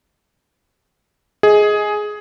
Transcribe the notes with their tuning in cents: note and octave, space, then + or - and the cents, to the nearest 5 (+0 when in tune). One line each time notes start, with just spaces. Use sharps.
G#4 +10 D#5 +20